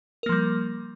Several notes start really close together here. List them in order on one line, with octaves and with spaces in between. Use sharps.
A#4 A#3 F3 G3